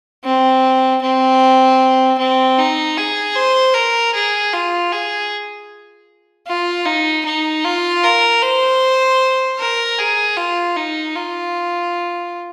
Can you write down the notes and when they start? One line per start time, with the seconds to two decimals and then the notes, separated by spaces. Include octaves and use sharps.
0.24 C4
1.02 C4
2.18 C4
2.58 D#4
2.97 G#4
3.35 C5
3.74 A#4
4.14 G#4
4.53 F4
4.92 G#4
6.47 F4
6.86 D#4
7.25 D#4
7.64 F4
8.03 A#4
8.42 C5
9.59 A#4
9.98 G#4
10.37 F4
10.76 D#4
11.15 F4